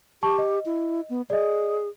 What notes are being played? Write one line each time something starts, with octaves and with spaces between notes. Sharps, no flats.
G4 A5 C#6
D#5
E4
B3
G#4 D5 D#5